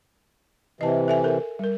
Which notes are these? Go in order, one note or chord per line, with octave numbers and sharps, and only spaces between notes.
C3 E3 D#5 A5
A4 E5 G#5
A4 A#4
G3 A#4